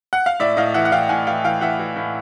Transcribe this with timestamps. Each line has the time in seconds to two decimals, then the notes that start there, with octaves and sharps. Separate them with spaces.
0.13 F#5
0.26 F5
0.40 A2 D5 E5
0.57 A2 D#5 F5
0.74 E3 E5 F#5
0.85 F#5
0.92 E3 F5 G5
1.09 A2 F#5 G#5
1.27 E3 F5 G5
1.45 E3 F5 G5
1.61 E3 E5 F#5
1.79 E3
1.96 A2